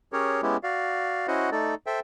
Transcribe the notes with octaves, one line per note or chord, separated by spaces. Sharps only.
C#4 G4 G#4 A#4 C#5
G#3 B3 C#4 E4 G4
F#4 D5 F5
C#4 E4 F#4 C5 D#5 F#5
A3 D#4 A4 D5
A4 C5 E5 G5